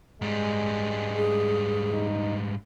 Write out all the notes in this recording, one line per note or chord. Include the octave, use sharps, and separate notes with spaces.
G#2 G3 G#3
G#4
D#4